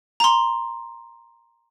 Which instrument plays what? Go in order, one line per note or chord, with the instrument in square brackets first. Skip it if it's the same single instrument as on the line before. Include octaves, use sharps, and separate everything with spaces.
[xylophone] A#5 C6